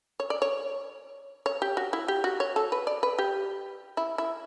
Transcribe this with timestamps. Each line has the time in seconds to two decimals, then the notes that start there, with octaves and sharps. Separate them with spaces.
0.20 C#5
0.30 D5
0.42 C#5
1.46 C#5
1.62 G4
1.77 F#4
1.93 E4
2.08 G4
2.24 F#4
2.40 C#5
2.56 A4
2.72 B4
2.87 D5
3.03 B4
3.18 G4
3.97 E4
4.18 E4